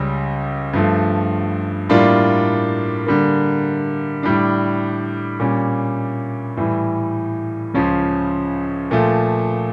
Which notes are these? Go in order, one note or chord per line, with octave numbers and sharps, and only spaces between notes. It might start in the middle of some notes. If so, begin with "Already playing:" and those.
Already playing: C#2 C#3 G3 C#4
G2 F3 A3
A2 G3 A#3 D4 F4
D3 G3 A#3
A2 G3 D4
A#2 G3 C#4
A2 E3 G3
C#2 C#3 F3 C#4
A#2 F3 A3